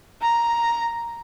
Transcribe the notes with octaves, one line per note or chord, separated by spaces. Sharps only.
A#5